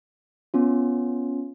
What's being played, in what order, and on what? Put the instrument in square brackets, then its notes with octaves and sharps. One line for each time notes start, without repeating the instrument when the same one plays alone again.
[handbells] B3 C#4 F4